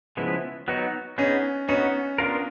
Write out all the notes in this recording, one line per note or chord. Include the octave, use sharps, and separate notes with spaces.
C#3 F3 G#3 B3 E4
F#3 B3 D#4 F#4
B3 C#4 D#4 G#4
B3 C#4 D#4 F#4
B3 D4 F4 A#4